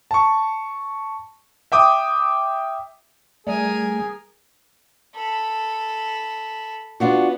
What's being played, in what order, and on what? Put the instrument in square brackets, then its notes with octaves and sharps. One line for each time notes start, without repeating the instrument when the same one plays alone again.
[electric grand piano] A5 C#6
E5 G5 D6 D#6
[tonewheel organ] G3 A3 [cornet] G#4 [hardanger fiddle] A#4 G#5
[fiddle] A4 B5
[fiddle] B3 [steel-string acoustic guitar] D4 F4 F#4